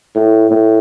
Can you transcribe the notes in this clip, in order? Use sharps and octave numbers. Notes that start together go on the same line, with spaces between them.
A2
A2